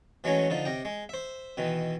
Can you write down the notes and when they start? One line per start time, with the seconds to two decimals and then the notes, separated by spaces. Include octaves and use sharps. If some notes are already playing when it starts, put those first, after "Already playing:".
0.24 E3 F#3 G#3 A3 C#4
0.50 D3 F3 D#4
0.65 C3 D#5 G5
0.85 G#3
1.09 C5 E5
1.57 B2 D#3 E3